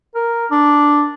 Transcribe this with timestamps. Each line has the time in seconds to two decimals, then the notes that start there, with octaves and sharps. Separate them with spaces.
0.15 A#4
0.51 D4